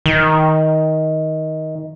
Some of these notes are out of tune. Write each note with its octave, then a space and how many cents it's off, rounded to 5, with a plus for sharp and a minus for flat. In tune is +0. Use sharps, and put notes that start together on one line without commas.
D#3 +15